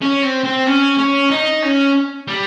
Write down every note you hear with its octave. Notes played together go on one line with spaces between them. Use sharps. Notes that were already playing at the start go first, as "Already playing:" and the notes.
C#4
C4
C4
C#4
C#4
D#4
C#4
G3